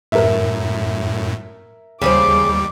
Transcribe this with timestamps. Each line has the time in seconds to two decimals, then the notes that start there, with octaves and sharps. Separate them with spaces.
0.12 F#2 A2 A#4 E5
2.02 D#2 C#3 G3 G#4 C5 D6